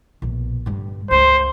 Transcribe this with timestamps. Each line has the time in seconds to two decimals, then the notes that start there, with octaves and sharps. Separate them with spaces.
0.22 A#1 B2
0.66 G2 D3
1.11 C#2 C5